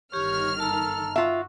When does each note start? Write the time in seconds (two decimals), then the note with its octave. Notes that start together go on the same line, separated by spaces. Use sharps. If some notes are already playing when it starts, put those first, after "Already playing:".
0.13 G1 D#3 G4 C#5 F6
0.60 A4 A5 A#5
1.16 F4 F#4 E5